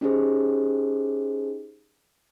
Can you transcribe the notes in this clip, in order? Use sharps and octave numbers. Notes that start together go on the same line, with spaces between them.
C#4 D#4 G4 G#4 C5